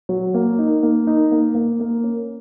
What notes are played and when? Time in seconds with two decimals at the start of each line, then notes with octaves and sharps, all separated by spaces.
0.09 F#3
0.34 A#3
0.59 D#4
0.83 A#3
1.07 D#4
1.31 A#3
1.55 A#3
1.80 A#3
2.04 C#4